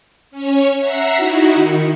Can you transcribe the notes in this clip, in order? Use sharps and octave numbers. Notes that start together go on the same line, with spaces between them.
C#4 C#5
E5 F#5 A#5 B6 C7
D#4 E4 F#4
D#3 C#7